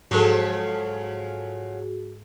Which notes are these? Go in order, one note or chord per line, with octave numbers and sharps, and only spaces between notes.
G#2 C#3 F3 F#3 F#4 G#4 A4